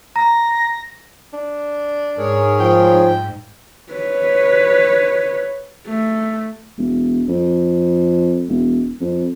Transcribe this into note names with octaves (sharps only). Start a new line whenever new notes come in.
A#5 A#6
D4
G#2 G#4 A#4 C#5
F3 G5
B4 C#5
A3
E1
F2
E1
F2